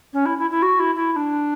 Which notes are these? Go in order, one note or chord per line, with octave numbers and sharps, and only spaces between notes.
C#4
E4
E4
E4
F#4
E4
E4
E4
D4